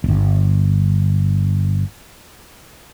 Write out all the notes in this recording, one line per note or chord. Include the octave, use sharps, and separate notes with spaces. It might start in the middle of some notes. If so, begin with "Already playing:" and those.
D1 G1